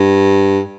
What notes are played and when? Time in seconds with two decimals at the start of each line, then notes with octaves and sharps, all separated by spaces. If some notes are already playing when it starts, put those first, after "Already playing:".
Already playing: G2